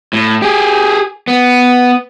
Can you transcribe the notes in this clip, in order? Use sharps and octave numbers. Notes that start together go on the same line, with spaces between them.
A2
G4 G#4
B3